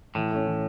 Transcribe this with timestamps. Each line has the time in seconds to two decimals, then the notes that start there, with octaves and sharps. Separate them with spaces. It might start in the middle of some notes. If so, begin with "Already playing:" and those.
0.15 A2 E3
0.31 A3 C#4
0.46 E3